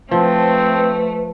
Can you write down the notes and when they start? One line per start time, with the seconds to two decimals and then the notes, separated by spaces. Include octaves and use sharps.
0.11 F3 A3 C4 B4